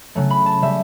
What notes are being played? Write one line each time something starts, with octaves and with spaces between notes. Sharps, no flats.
C#3 F#3 A3
B5
A5
C#3 G3 E5